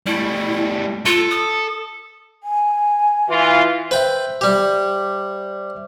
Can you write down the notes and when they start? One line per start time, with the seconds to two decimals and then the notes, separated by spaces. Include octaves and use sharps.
0.06 G3 A3 E4
1.06 F4 A4
1.31 D#6
2.44 G#5
3.29 E3 F4
3.91 B4 C5 E5 G5
4.41 G3 G4